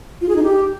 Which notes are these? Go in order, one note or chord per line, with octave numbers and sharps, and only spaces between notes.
F4
G#4
D#4
G4